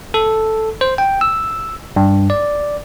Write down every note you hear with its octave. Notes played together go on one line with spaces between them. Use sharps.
A4
C5
G5
E6
G2
D5